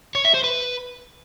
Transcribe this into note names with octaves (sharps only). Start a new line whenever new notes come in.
C#5
E5
C5
B4